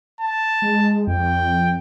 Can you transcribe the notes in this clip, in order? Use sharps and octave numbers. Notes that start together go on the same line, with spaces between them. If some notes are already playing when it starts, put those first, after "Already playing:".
A5
G#3
F2 G5